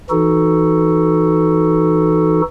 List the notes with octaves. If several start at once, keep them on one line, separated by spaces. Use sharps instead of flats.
E3 D#4 F#4 A4